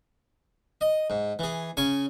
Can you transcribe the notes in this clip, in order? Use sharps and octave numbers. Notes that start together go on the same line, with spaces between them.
D#5
G#2
E3 G#4
C#3 G#5 C#6